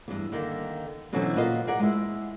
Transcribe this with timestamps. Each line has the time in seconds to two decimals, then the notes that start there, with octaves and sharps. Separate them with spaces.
0.08 E2 G2
0.32 D3 D#3 A#3
1.13 B2 D3 E3 F#3 C4 C#4
1.36 A#2 F#4 B4 D#5 F5
1.67 G#4 A#4 D5 F#5
1.80 G#3 E4